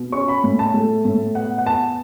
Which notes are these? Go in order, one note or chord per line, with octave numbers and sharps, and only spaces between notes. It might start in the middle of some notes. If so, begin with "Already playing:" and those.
Already playing: B2
C#4 C#6
B5
A2
A5
A3
A2
B3 F#5
F#5
E2 A5